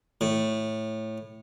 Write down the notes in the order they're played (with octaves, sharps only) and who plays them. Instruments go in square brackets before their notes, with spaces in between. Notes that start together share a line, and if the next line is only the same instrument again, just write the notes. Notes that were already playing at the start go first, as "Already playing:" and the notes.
[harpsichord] A2